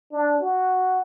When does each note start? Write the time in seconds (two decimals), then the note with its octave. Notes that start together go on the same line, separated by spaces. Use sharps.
0.12 D4
0.40 F#4